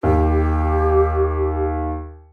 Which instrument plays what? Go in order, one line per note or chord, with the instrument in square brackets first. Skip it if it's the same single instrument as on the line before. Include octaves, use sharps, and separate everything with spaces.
[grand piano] D#2 [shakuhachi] G4